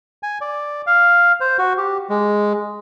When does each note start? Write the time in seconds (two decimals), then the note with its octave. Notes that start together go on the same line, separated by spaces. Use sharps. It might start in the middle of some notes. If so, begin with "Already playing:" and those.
0.23 G#5
0.41 D5
0.87 F5
1.40 C5
1.59 F#4
1.78 G4
2.10 G#3